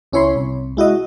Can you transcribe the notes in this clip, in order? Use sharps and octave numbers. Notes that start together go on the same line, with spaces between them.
C#2 C#4 E4 C#5 B5 C6
C2
G#3 E4 F#4 D#5